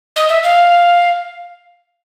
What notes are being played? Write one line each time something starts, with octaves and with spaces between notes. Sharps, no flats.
D#5
E5
F5